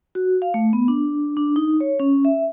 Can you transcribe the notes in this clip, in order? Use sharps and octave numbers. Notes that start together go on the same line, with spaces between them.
F#4
F5
A3
B3
D4
D4
D#4
C#5
C#4
E5